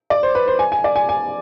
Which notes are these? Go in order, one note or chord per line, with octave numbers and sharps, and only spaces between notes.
D5
C5
B4
C5
G#5
G#5
D5
G#5
G#5